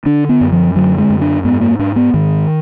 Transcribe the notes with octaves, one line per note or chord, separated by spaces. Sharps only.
D3 D4
B3
F#2
F3
D3 F#3
G#3
F#2
D4
G#2 B3
A#3
G#2 D4
B3
G#2 D#3